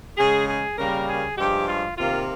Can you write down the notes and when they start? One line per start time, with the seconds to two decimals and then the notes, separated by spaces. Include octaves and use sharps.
0.17 C#3 G#3 G#4
0.48 G#4
0.78 C#3 G3 A#3 A#4
1.08 G#4
1.37 G2 F3 G#3 G4
1.67 F4
1.98 C3 D#3 A#3 F4